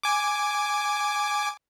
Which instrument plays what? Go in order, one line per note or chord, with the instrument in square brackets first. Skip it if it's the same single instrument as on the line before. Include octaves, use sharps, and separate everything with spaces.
[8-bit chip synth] G#5 D6